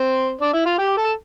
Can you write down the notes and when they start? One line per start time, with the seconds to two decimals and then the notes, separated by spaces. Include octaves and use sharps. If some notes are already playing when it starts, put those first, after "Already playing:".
Already playing: C4 C5
0.41 D4 D5
0.53 E4 E5
0.66 F4 F5
0.78 G4 G5
0.97 A4 A5